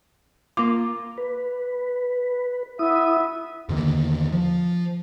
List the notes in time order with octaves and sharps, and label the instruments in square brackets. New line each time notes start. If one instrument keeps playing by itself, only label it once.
[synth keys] A#3 F4 [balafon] D6
[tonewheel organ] B4
[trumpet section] B3 E5 [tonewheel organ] E4 D#6
[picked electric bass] E2 D3 D#3 A#3
F3